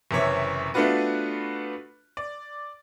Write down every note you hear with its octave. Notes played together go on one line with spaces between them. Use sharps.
F#1 C3 E3 C#5 E5
A3 B3 D4 F4 F#4 B4
D5